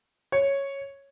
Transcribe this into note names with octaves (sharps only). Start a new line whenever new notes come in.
C#5